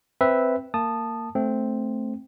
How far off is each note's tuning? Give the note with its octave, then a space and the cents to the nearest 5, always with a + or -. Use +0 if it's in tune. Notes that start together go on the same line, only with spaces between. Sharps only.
C4 +0 B4 +0 E5 -5
A#3 -20 A5 +0 D#6 -20
A3 -5 C4 +0